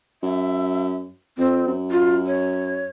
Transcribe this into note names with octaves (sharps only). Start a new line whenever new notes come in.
F#2 E5
F2 C4
F#2
F4
C#5